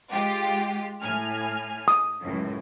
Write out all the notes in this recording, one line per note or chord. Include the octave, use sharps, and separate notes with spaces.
G#3 F4 G4
A2 G#5 F6
D#6
C#2 F#2 A2